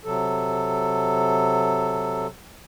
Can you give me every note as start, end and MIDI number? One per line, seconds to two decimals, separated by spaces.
0.05 2.27 48
0.05 2.27 54
0.05 2.27 69